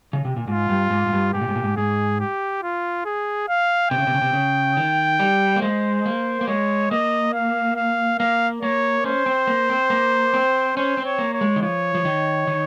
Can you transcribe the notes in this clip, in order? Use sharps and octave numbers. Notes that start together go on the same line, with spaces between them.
C#3
C3
A#2
G#2 F4
G2
G#2
G#2
G2
G#2 G4
A#2
G#2
A#2
G#2
G#2 G#4
G4
F4
G#4
F5
C3 G5
C#3
C3
C#3
C3
C#3
D#3
G3
A#3
G#3 C5
A#3
A#3
G#3 C#5
A#3 D#5
F5
F5
A#3 F5
A#3 C#5
C#4 C5
C4
A#3
C4
A#3
C4
C#4 C5
C4
C#5
A#3
C#5
G#3
D#3
F3 C#5
F3
D#3
D#3